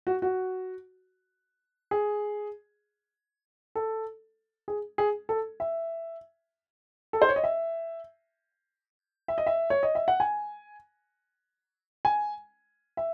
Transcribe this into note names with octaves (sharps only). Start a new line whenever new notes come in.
F#4
F#4
G#4
A4
G#4
G#4
A4
E5
A4
C5
C#5
D#5
E5
E5
D#5
E5
C#5
D#5
E5
F#5
G#5
G#5
E5